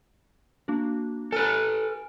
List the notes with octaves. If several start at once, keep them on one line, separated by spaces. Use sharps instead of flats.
A#3 D4 F#4
A4 B4 G#5 F6 D7